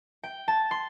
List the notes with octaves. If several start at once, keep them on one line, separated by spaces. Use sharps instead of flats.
G5
A5
C6